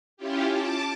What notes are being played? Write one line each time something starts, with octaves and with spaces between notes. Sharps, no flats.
C#4 E4 F4 G4
A5 D6